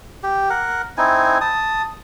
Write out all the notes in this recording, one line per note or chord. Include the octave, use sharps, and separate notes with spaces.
G4
A#4 F#5
C4 D#4 E4 G#5
A5 D#6